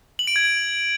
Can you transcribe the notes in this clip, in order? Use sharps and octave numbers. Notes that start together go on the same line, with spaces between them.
F#7
D7
G#6